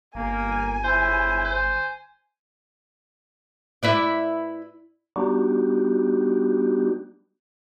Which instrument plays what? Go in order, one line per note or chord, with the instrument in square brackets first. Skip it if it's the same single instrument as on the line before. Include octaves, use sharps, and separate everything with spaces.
[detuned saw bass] G1 [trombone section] A#3 [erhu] G#5
[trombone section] C#2 E4 [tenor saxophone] C5
[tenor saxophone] C5
[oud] E4 B4 D5
[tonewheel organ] G3 B3 D4 D#4 F#4 G4